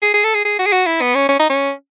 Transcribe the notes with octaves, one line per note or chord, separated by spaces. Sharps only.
G#4
G#4
A4
G#4
G#4
F#4
G#4
F#4
E4
B3
C#4
C#4
D#4
C#4